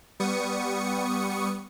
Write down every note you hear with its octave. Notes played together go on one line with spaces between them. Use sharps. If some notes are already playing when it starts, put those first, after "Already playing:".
G3 B3 C#6 D#6 C#7